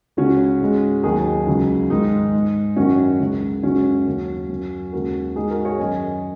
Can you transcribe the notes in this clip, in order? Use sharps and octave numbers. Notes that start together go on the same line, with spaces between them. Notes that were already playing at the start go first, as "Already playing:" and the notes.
C#2 C#3 G#3 C#4 F#4
G#2 G#3
D#2 D#3 F#3 D#4 G#4
C#2 C#3 F#3
G#2 D#3 G#3 D#4
G#2 G#3
F#2 D#3 F#3 C#4 F#4
C#2 C#3 G#3
F#2 C#3 G#3 C#4 F#4
D#2 C#3 F#3
F#2 F#3
D#2 C#3 G#3 F#4 A#4
G#2 G#3 D#4 G#4
F#4 A#4
G#4 C#5
F#2 D#3 F#3 D#5 G#5